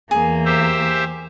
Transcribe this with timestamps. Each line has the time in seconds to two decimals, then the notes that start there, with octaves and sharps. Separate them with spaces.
0.11 E2 A#3 G#4
0.45 G4 C5 E5